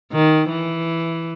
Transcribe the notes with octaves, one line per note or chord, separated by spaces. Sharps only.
D#3
E3